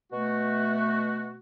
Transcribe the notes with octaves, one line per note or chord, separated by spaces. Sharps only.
B2 A3 F#4